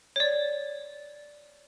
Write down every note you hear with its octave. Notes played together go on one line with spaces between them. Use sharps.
C#5 D5